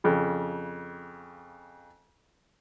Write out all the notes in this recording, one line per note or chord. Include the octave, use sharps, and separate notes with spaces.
F2 C#3